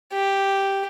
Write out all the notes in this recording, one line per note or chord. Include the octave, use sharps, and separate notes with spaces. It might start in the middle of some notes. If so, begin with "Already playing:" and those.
G4